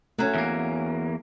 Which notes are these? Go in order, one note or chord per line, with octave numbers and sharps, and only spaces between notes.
F#3 A3 C#4 C#5
E2 A#3